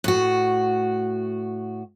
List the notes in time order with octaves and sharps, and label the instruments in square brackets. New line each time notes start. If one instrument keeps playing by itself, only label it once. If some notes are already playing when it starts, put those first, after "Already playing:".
[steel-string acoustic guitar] A2 F#4